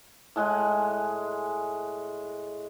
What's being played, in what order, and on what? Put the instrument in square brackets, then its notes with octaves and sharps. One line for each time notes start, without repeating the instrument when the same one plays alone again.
[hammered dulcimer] A2 G#3 F#5 G#5